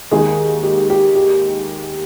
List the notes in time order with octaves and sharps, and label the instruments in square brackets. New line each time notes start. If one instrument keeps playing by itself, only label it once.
[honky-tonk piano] D#2 D#3 G#3 D#4 [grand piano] G#4
[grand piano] G4
G4
G4